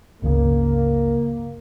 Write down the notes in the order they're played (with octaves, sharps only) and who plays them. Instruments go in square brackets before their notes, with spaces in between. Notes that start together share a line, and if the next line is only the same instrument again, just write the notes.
[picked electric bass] G1 C#2 C#3 [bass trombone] A#3